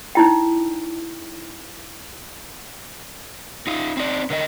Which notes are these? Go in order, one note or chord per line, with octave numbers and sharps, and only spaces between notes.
D#4 E4 G5
D#4 F4
C4 D#4 D5
D3 A#4 D#5